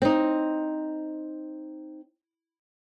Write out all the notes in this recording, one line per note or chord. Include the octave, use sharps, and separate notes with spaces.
C4 D#4